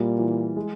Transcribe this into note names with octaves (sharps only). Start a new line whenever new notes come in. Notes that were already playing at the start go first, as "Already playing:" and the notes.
Already playing: A#2 G3 E4
E3
G#3